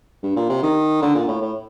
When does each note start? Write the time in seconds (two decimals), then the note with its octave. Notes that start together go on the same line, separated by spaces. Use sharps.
0.23 G2
0.36 A#2
0.49 C3
0.63 D#3
1.02 D3
1.15 A#2
1.28 A2
1.41 A2